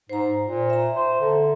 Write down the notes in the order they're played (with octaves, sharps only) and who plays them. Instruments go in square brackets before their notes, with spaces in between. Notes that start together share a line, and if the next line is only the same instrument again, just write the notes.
[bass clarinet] G#2 [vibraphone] C5 A#5
[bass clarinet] A#2
[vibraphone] E5 A#5
[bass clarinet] C5
D3